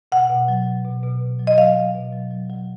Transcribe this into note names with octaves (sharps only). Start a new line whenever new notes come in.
B2 F#5
B2
F#3
F#3
B2
B2
B2
F#3
D#5
F#3 F5
F#3
B2
F#3
F#3
F#3